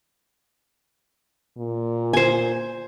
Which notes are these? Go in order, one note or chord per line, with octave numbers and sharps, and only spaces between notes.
A#2
C5 G#5